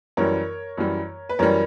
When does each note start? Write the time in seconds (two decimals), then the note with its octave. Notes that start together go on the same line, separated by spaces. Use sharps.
0.17 F#2 E3 G3 A#4 C#5
0.77 F#2 E3 G3
1.29 B4
1.39 F#2 E3 G3 A#4 C#5